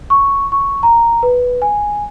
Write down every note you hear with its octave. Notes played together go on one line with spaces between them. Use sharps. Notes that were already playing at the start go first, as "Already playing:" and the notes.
C#6
C#6
A#5
B4
G#5